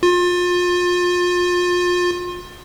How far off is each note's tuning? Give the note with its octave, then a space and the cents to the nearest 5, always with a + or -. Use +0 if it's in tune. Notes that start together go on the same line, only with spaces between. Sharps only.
F4 +30